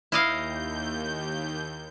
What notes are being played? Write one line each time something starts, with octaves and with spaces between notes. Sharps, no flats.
D#2 E4 D#5 F5 G6